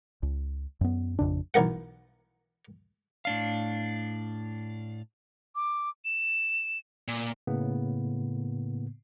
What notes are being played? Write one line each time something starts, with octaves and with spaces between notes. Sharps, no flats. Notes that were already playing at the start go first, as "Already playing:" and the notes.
C#2
F#2 B3
A1 F2 C#3 D4
B1 E3 A#4 F#5
A2 D4 F5
D6
E7
A#2
A2 C#3 A#3 B3